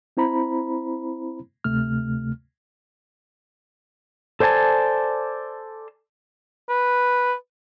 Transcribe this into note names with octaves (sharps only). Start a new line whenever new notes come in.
C4 E4 C5 A#5 B5
D2 C3 A3 F6
A4 C5 D5 G#5 A5
B4